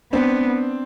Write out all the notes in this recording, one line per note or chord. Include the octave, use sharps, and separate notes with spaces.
B3 C4 D4